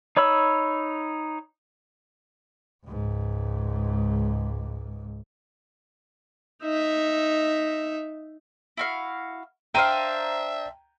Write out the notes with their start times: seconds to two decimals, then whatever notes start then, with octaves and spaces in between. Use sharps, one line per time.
0.17 D#4 C#5 B5 E6
2.86 C#2 G#2
6.63 D#4 E5
8.77 E4 F#4 F5
9.75 D4 C5 E5 F5 G5 A#5 D#7